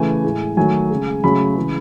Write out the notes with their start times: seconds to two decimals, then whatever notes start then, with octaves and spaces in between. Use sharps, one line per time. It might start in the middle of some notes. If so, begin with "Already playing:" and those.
Already playing: C#3 E3 A3 G#5
0.24 A2 G#3
0.57 D#3 F#3 A3 G#5
0.90 C#3 G#3
1.24 C#3 F#3 A3 B5
1.56 C#3 E3 G#3